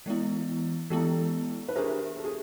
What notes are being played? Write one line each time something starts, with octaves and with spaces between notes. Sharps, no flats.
E3 G#3 B3 E4
E3 G#3 B3 E4 G4 A4
B4
D4 G4 G#4 A#4 C5 E5
A4
G#4